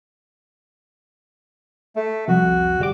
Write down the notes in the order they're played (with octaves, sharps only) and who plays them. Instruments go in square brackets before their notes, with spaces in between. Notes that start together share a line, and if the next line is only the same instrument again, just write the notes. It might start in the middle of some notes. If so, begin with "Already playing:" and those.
[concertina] A3
[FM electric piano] C2 F2 [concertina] F#4
[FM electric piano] G1 G3 D6